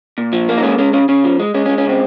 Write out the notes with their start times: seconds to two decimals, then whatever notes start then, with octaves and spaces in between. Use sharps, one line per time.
0.18 A#2
0.33 F3
0.49 A#3
0.57 D#4
0.63 G#3 C#4
0.79 G#3 C#4
0.93 C#3 C#4
1.09 C#3 C#4
1.24 F3
1.39 G#3
1.54 G#3 C#4
1.66 C#4
1.69 G#3
1.78 C#4
1.85 C#3 C4